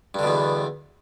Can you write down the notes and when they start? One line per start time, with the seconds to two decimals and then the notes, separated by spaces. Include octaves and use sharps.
0.14 G2
0.19 D3
0.23 B2
0.27 E2